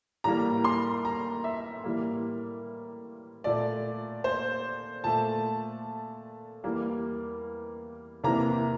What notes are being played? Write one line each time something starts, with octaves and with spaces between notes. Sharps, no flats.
A2 E3 G3 A#3 A#5
C6
A#5
E5
A2 E3 G3 A#3
A#2 A3 D5
C5
A#2 A3 A5
E2 E3 G3 A#3
E2 C3 E3 A#3 A#5